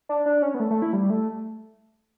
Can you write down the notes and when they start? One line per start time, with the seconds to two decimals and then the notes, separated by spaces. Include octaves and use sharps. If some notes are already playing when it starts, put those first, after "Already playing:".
0.09 D4
0.26 D4
0.42 C#4
0.54 B3
0.60 A3
0.70 A3
0.82 E4
0.93 G3
1.10 A3